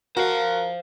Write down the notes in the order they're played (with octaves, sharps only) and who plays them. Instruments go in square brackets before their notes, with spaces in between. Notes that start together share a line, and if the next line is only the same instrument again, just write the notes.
[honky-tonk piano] F#4 [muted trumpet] A#4 [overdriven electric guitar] C5 F5